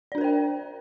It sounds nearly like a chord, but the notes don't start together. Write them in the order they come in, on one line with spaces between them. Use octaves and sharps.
D5 D4 A#4 C5 G5